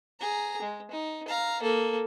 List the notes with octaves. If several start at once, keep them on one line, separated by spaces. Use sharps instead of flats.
G#4 A#5
G#3
D#4
F5 A#5
A#3 A4